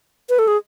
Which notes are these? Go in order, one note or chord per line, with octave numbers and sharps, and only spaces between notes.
B4
A4
G#4